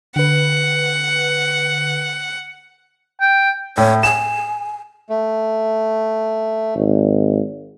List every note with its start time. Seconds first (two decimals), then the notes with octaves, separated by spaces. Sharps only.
0.16 D3 B4 F#5
3.21 G5
3.77 A2 C#5
4.03 G#5 E7
5.10 A3
6.75 G#1